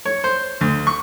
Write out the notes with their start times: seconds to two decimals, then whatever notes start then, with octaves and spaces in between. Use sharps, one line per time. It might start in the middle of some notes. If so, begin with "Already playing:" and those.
0.05 C#5
0.24 C5
0.61 D2
0.87 C#6